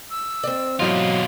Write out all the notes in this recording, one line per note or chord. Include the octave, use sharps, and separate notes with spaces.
E6
C4 D5
B2 E3 F#3 F4 G4 D#5 F5